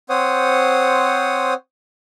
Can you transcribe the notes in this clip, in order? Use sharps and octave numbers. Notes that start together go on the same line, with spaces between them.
C4 C5 C#5 F#5 D#6